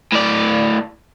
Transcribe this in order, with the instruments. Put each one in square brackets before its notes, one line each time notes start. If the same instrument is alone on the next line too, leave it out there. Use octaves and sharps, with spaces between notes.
[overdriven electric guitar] A2 D5